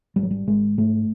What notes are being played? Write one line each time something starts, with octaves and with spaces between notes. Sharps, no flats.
G#1 G3
F#3
G3
G#1 G#3
G#2 A3